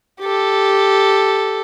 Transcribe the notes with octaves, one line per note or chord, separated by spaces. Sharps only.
G4 A4